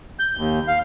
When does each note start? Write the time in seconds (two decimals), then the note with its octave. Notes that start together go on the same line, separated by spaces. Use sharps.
0.19 G6
0.37 D#2
0.68 F5